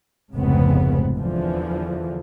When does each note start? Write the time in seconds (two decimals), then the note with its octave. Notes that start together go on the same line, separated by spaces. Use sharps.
0.34 F1 C#2 G#2 C#3 B3 C4
1.18 E2 D3 E3 F3